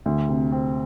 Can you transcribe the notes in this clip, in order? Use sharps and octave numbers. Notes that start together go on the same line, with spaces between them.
D2
C3
C4